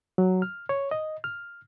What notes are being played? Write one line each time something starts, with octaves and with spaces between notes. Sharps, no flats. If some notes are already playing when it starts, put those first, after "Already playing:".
F#3
F6
C#5
D#5
F6